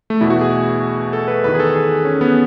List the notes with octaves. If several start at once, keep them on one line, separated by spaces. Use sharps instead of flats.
A3
E2 B2 E4
F#4
G#4
A4
B4
E2 D#3 B4
G#4
A4
G#4
C#4
B3